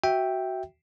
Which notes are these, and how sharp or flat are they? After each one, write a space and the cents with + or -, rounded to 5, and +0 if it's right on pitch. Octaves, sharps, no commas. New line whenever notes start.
F#4 +15 E5 -5 G5 +0